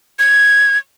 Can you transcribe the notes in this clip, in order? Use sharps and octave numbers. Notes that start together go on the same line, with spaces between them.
G#6